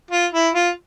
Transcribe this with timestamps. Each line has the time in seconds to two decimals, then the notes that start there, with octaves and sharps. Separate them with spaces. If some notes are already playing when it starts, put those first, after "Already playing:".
0.11 F4
0.33 E4
0.55 F4